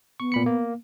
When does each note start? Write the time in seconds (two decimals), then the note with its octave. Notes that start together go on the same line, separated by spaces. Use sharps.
0.20 B3 C#6
0.32 A#2 B5 C#7
0.46 A#3